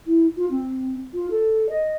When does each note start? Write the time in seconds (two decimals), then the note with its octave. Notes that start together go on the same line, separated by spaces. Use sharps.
0.07 E4
0.36 F4
0.50 C4
1.14 F4
1.30 A4
1.69 D#5